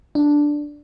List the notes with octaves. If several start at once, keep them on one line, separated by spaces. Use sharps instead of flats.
D4